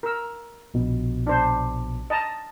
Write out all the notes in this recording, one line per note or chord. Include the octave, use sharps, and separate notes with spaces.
A#4 E6
A#1 B2
D4 C5
D#5 A5 A#5